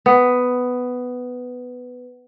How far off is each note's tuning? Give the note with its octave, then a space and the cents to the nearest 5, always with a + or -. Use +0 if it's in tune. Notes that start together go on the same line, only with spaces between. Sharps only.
B3 +10